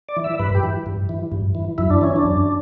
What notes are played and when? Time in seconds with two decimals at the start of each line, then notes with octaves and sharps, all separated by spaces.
0.09 D5
0.16 E3
0.24 E5
0.39 G2 B4
0.55 G4
0.63 E3
0.86 G2
1.09 E3
1.32 G2
1.55 E3
1.78 F#2 E4
1.90 D4
2.01 E3 C#4
2.16 D4
2.24 F#2